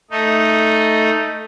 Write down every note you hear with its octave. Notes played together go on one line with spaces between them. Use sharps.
A3 D#4